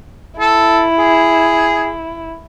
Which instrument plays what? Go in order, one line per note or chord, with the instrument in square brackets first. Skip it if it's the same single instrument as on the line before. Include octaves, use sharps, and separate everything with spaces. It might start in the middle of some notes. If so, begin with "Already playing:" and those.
[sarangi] E4 [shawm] A4
[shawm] G#4